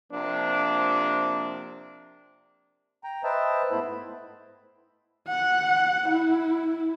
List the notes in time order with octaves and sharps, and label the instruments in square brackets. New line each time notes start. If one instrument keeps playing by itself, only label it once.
[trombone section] C3 F3 A#3 D4
[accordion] G5 A#5
B4 C5 D#5 E5 G5 A5
G#2 A3 B3 E4 C5 B5
[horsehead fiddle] F#5
E4